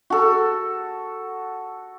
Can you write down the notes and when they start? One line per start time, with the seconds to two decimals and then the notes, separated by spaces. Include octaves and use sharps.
0.10 F#4 A4